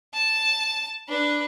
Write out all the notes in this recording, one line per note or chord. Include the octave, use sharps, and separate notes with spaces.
A5
D4 B4